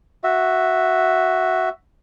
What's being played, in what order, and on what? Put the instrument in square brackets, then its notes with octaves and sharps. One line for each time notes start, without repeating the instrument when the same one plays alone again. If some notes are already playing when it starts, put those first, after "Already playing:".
[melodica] F#4 E5